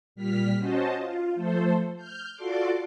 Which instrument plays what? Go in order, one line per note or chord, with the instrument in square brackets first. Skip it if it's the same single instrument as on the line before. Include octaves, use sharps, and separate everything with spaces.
[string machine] A#2 G3 F6 B6
C#4 F#4 C5 D#5 A5
F4
F3 A3 A4 C5
F6 G6
F4 F#4 A4 D5 C6 D6